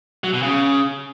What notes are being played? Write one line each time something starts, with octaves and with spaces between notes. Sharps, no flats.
F#3
B2
C#3